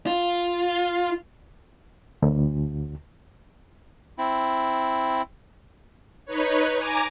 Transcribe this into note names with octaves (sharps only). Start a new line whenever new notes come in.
F4
D2
C4 E4
D#4 B4 C#5
G#5 A#5 D6